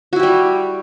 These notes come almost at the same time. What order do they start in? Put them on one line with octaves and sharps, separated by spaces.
F#4 E4 G4 G3